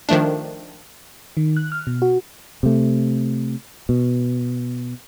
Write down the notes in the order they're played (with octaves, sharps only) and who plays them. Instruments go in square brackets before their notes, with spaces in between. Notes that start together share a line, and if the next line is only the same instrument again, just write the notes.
[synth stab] D#3 F3 A3 D4
[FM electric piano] D#3
F#6
F6
B2
F#4
[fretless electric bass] C3 A3
B2